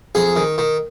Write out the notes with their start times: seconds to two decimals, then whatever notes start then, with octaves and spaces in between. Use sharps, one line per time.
0.15 F2 G#4
0.36 D#3
0.58 D#3